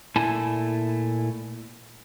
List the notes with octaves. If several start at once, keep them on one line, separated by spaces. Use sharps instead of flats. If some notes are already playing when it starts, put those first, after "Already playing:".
A#2 A3 E4 G#5 A5